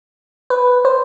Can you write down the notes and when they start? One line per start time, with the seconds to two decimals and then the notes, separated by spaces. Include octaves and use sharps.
0.50 B4
0.85 C5